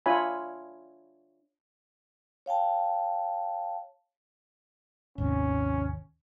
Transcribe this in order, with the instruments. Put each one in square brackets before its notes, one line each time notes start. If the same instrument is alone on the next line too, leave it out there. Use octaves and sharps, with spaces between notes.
[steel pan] D4 F4 C#5 E5 G#5 B5
[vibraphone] C#5 F5 G5 A5
[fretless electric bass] G#1 D#2 C3 [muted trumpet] C#4